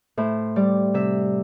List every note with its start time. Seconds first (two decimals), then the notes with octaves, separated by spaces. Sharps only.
0.17 A2 C5
0.56 G3 D5
0.94 C3 E5